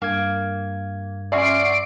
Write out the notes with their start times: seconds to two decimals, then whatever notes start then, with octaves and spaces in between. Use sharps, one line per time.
0.02 G2 A#3 G#6
1.32 C#4 F#4 D5 E5 C6 C#6 C7 D7